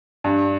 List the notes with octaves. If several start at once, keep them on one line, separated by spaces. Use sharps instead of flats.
G2